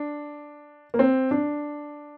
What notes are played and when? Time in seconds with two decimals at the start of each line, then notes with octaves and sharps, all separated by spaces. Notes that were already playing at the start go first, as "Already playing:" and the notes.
Already playing: D4
0.94 A#3
0.99 C4
1.31 D4